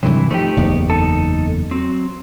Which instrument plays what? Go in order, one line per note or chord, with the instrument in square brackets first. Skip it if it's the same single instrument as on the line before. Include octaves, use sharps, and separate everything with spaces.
[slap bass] G2 D#3 F#3 [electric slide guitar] C3 E3
[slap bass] F3 [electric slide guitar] A3 D#4 G4
[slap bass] F#1 E2 B3
[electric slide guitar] D#4 A4
F#3 C4